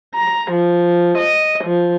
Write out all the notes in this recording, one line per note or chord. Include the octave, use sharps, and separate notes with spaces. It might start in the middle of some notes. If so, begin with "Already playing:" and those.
A#5
F3
D#5
F3